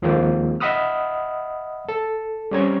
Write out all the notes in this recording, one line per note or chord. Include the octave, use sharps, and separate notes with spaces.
D#2 F3 G#3 A#3 C4
D#5 E5 F#5 B5 D#6 F6
A4
G3 C4 C#4 A#5 G#6